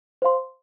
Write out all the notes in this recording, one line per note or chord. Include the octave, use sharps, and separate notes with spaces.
C5 F5 C6